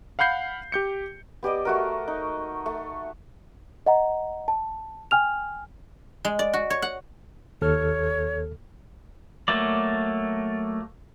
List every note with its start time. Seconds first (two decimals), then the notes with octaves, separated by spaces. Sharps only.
0.19 F5 F#5 B5 G6 C7
0.72 G4 G6 C#7
1.43 B3 G4 D5 D#5
1.65 A3 F#4 A#4
2.08 D#4
2.66 A3
3.86 D#5 F#5 A#5
4.48 A5
5.11 G5 G#5 F6 F7
6.25 G#3
6.39 D5
6.53 F#4
6.70 C#5
6.82 F#5
7.62 D#2 A4 C#5 F6
9.48 F#3 A3 A#3 D5